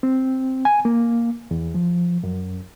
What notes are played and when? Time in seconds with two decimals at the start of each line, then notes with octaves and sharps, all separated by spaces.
0.03 C4
0.65 G#5
0.85 A#3
1.51 E2
1.75 F3
2.23 F#2